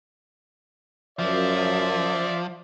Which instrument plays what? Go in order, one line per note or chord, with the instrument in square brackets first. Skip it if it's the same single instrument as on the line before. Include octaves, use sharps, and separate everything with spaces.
[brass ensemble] F#2 [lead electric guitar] F3 [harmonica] D5 E5